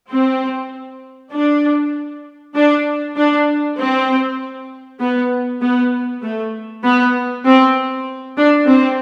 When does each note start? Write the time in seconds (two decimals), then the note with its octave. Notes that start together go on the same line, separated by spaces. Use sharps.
0.10 C4
1.33 D4
2.56 D4
3.16 D4
3.78 C4
5.01 B3
5.62 B3
6.23 A3
6.84 B3
7.45 C4
8.37 D4
8.67 C4